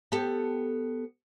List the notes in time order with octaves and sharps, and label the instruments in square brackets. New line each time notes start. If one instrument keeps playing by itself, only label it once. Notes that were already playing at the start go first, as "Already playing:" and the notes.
[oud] B3 G4 A4